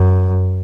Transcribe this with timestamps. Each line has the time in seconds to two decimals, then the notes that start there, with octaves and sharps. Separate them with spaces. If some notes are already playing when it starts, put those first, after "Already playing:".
Already playing: F#2